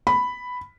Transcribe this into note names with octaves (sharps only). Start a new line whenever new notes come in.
B5